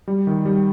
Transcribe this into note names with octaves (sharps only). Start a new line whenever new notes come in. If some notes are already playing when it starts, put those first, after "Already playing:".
G3
D#3
G3